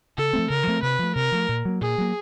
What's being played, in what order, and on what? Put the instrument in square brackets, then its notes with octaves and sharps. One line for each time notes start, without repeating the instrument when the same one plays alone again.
[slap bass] C#3 [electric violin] A4
[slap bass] F3 A3 C4
[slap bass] C#3 [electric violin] A#4
[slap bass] F3 A3 C4
[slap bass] C3 [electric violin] B4
[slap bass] F3 A3
[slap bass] C3 [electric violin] A#4
[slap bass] F3 A3
A#2
F#3 A#3
[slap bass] A#2 [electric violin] G#4
[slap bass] F#3 A#3